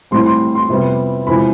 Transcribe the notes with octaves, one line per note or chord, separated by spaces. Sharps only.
A1 A2 G3 C4 C6
C6
C6
F2 C3 G3 B3
E1 E2 C3 F3 B5